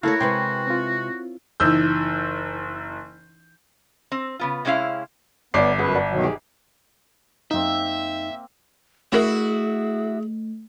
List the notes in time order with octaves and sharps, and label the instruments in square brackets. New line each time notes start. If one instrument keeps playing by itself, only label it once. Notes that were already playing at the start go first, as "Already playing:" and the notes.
[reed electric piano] A3 A4 F5 [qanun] E4 A#4 C#5 [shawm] F#4
[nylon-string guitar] C3 G#3 B4 [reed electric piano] G5 C6 C#6
[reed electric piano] C4 F4
[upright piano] F#1 E6 G6 [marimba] E3 D#4 E4
[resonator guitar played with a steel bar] C4
C#3 B3 F4
C3 G#3 C#4 E4 F5
[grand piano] G1 D6 C7 [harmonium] B3 [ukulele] C#5 D5 F#5
[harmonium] F#2 B4 [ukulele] C#4 G#4 F#5
[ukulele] C#5 D5 F#5
[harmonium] B2 D#3 F#3
[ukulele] D#4 G4 G#4
[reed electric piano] F#2 D#4 [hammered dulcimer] A#3 C4 [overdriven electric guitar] E5
[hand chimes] A3 [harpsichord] C#4 A#4 [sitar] E4 F#4 [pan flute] G#4